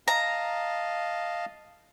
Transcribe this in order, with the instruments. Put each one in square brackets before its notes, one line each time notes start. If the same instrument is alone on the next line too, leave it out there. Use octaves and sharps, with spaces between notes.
[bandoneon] D#5 F5 A5 [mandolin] A#5